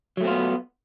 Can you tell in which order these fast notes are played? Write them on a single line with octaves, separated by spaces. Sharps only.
F#3 A3 C4 F4 B3